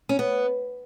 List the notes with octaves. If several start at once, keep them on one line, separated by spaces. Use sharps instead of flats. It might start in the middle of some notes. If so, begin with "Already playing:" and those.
C#4
B3